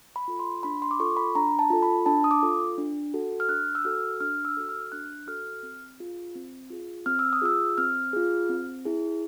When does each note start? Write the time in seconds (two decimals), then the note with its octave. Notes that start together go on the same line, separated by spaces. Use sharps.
0.16 B5
0.28 F4 A4
0.39 C6
0.63 D4 B5
0.82 C6
0.91 D6
1.00 F4 A4 C#6
1.17 B5
1.35 D4 A#5
1.59 A5
1.70 F4 A4
1.83 B5
2.06 D4 A5
2.24 D#6
2.31 D6
2.43 F4 A4
2.78 D4
3.14 F#4 A4
3.40 F6
3.49 D4 F#6
3.75 E6
3.84 F#4 A4 F6
4.21 D4 F6
4.45 E6
4.57 F#4 A4
4.69 F6
4.92 D4 F#6
5.27 F#4 A4 F6
5.63 C4
6.00 F4 G#4
6.35 C4
6.70 F4 G#4
7.06 C4 F6
7.19 E6
7.33 D#6
7.42 F4 G#4 E6
7.78 C4 F6
8.13 F4 G#4
8.50 C4
8.85 E4 G#4